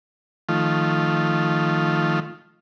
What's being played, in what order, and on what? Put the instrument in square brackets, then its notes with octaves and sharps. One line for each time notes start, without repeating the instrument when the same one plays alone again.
[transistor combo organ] D#3 F3 A3 F4